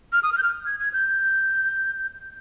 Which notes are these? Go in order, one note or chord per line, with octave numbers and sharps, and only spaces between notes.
F6
D#6
F6
G6
F6
G#6
G#6
G6